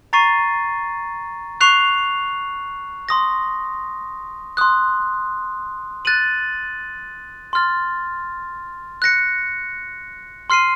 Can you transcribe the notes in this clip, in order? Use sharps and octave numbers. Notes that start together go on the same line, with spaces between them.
A#5 C#6 A6 C7 D#7
C#6 F#6 C7 F7
C6 D#6 A#6
C6 D#6 F#6
F#6 A6 D#7 F#7
C6 F6 A6
F#6 A#6 C#7
C6 F6 C7 D#7